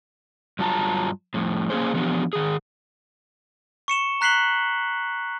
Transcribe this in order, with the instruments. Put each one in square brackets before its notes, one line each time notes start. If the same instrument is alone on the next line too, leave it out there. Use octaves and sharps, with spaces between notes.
[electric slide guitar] G2 F#3 F4 A5 A#5
F2 A2
A#3 C#4 G#4 C5
E3 F3 B3 D4 G4
D#3 G#4
[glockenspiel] C#6 C#7 E7 G7
A#5 F#6 B6 C7 F#7 G7